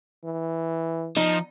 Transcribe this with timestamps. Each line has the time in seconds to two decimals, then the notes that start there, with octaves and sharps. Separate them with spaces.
0.24 E3
1.16 F3 D#4